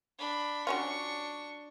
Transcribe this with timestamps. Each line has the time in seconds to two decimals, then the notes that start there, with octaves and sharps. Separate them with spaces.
0.19 D4 B5
0.67 F#3 C#4 D4 F4 C#6